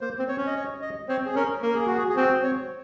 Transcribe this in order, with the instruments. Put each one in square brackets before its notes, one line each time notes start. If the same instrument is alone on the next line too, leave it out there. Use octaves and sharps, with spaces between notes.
[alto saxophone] A#3 [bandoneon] C5
[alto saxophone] C4
[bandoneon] C#5
[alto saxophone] C#4
[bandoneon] D#5
C#5
D#5
[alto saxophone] C4 [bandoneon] C#5
[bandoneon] G#4
[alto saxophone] C#4 [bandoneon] A#4
[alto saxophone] A#3 [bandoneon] A#4
[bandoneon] G#4
F#4
G#4
G#4
[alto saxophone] C4 [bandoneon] F#4
[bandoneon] C#5